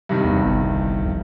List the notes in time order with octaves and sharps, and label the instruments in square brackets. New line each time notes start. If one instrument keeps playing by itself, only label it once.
[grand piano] G2 C3 D#3
[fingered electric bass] E2 B3
G1 C2
F2